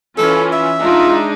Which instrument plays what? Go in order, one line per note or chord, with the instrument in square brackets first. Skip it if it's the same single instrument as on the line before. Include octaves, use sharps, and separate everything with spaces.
[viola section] E3 C#4 F4 [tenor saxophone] A4
[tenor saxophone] E5
[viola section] G#3 D4 D#4 [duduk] F4